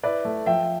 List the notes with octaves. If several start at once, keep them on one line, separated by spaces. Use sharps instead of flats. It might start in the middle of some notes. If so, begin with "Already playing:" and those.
E4 B4 D5
A3
F3 E5 G5